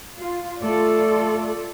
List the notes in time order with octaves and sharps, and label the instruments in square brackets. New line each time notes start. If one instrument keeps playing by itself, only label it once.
[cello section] F4
[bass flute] A3 [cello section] F4 A4 D5